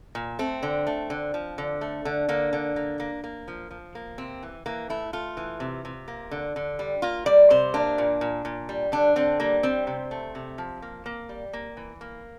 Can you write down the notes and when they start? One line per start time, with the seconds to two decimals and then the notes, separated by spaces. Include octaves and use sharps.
0.15 A#2
0.39 A3 C4
0.63 D3
0.87 A3
1.10 D3
1.34 F3
1.58 D3
1.81 A3
2.05 D3
2.29 D3 A#3
2.53 D3
2.76 A#3
3.00 A#3
3.24 A#3
3.48 F3
3.71 F3
3.95 A#3
4.18 C3 C4
4.43 E3
4.66 E3 A#3
4.90 A3 E4
5.13 A3 F4
5.37 E3
5.60 C3
5.85 C3
6.08 A#3
6.31 D3
6.56 D3
6.79 G3
7.02 A#3 F4
7.26 G3 D5
7.50 C3 C5
7.74 A#3 D4
7.98 A#2
8.21 A#2
8.45 A#2
8.69 G3
8.92 D3 D4
9.16 D3 C4
9.40 G3 A#3
9.63 G3 C4
9.87 C3
10.11 A3
10.35 C3
10.58 F3
10.82 A#3
11.06 A#3
11.29 G3
11.53 A#3
11.77 E3
12.01 A#3